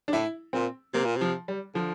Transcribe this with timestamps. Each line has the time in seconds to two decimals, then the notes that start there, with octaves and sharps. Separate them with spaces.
0.08 D4
0.13 A2 E4
0.53 A#2 C4
0.94 C3 A#3
1.05 A#2
1.17 C3 F3
1.48 G3
1.74 D3 F3